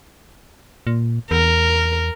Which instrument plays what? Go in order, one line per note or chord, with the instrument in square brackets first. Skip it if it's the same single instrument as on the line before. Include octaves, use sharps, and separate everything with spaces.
[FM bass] A#2
[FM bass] E2 [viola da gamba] A#4